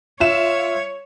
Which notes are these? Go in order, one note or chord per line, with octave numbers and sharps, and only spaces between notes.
F4 C#5 E5 E7